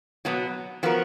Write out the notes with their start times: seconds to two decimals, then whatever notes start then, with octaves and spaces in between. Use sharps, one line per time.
0.25 B2 F#3 B3
0.83 F3 B3 F#4 A#4